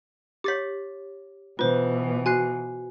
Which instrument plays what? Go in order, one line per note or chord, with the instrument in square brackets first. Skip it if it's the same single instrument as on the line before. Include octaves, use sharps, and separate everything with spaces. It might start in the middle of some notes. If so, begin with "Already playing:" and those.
[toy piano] G4 C#5 [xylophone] D6 A6 B6
[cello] B2 E3 [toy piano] F4 [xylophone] B4 C5
[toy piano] F#4 [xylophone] G#5 F#6 C7